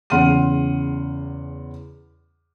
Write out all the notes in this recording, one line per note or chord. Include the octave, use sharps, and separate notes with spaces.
E2 C#3 F#5 C6 F6 D#7